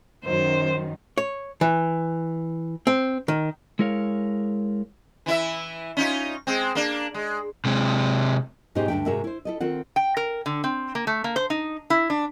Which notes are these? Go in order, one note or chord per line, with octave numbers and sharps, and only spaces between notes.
F#2 D#3 C5
C#5
E3
C4
D#3
G#3 E4 A#4 C#5 F5
E3 E4 E5
C#4 D#4 F4
G#3 C4
A#3 D4
G#3
C3 G#3
G#2 B2 G#3 D#4 G4 C5
D2 G2 D#3 D4 E5 G5
G#2 C3 G#3 F#4 A#4 E5
E4 C5
E4 A4 D#5
D#3 C4 F4 F#5
G5
A#4
D3
C4
A#3
A3
A#3
C5
D#4
E4
D4